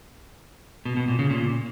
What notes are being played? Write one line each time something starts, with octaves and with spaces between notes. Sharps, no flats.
B2
B2
A#2
C#3
A#2